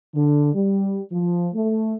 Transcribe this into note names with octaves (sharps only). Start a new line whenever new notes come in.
D3
G3
F3
A3